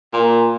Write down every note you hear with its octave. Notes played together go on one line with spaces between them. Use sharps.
A#2